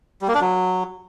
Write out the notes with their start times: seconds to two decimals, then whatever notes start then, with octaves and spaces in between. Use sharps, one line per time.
0.21 G3
0.28 A#3
0.34 D4
0.41 F#3